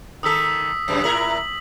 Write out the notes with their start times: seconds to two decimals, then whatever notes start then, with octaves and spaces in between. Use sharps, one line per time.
0.23 D#3 A4 D#6 E6 B6
0.88 F#2 C#3 G#3
1.04 A2 E4 A#4 F#7